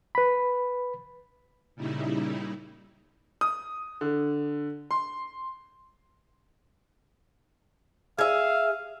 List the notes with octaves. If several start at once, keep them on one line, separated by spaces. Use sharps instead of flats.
B4 B5
A#2 C#3 G3 D#4 E4
D#6
D3
C6
G#4 E5 F5